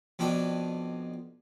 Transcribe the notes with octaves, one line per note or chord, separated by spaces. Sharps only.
F2 B2 D4 G5